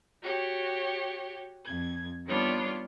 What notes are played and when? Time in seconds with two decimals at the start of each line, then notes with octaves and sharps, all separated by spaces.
0.21 F#4 G4 C#5
1.65 F2 G#6
2.27 D#3 G3 B3 D4 F4 C#5